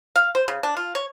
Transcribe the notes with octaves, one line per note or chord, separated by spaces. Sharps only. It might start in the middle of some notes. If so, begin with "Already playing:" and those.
F5
C5
C#3
D4
F4
C#5